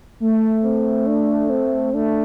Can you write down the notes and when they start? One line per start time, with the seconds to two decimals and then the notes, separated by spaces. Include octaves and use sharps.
0.20 A3
0.64 C4
1.07 D4
1.50 C4
1.94 A3 D4